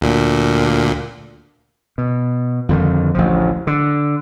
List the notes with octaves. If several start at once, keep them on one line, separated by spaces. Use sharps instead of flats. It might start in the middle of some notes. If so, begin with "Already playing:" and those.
D2 A#2
B2
F2 D3 D#3
A1 D2 F3
D3